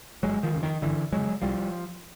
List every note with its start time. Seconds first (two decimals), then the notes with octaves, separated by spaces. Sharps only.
0.23 G1 F#3 G#3
0.43 D#3 F3
0.53 F2 C#3
0.63 D#3
0.82 G1 D3 E3
1.12 F2 C#3 F#3 G#3
1.42 C2 F3 G3